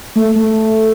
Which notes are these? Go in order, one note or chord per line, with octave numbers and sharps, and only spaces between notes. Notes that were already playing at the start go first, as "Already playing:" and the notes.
A3
A3